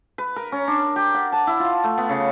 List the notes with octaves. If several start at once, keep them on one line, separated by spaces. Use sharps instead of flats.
B4
A#4
C#4
D4
G4
F#5
A5
E4
F4
A3
B3
C#3